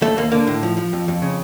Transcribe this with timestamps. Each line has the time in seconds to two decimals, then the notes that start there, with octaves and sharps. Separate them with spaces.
0.02 D#2 A3
0.17 D#2 A#3
0.32 D3 A#3
0.47 A2
0.63 F3
0.77 F3
0.93 F2
1.08 F2
1.22 C#3